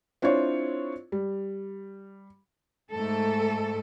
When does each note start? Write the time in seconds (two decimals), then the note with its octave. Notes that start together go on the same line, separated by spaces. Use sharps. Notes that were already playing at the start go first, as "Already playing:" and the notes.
0.22 C4 D4 E4 F4 C#5
1.12 G3
2.91 G#2 A3 A4